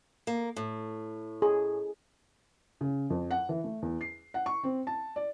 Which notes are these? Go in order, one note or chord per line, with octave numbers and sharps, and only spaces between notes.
A#3
A2
G#4
C#3
F2
F#5
E3
A3
E2
C7
F#5
C#6
C4
A5
D5